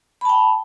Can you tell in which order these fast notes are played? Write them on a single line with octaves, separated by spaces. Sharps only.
B5 A5 G5